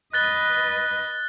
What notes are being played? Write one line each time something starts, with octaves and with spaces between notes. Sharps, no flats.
B4 D#5 F#6 A6 G7